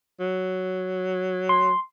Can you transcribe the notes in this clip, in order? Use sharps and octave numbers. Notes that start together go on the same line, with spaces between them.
F#3
C6